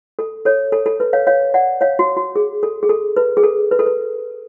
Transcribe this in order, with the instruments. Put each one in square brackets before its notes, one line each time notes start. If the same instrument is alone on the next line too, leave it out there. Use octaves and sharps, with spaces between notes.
[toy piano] A4
A4 C#5
A4
A4
B4
C#5 F5
C#5 F5
D5 F#5
C#5 F5
F#4
F#4
G#4
A4
G#4
A4
B4
G#4
A4
B4
A4
B4